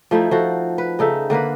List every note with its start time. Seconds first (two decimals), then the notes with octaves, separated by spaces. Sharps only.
0.11 F3 A3 D#4 E4
0.31 F3 F#4 A4
0.78 B4
0.99 C#3 D#4 A4 E5
1.30 D3 A#3 A#4 B4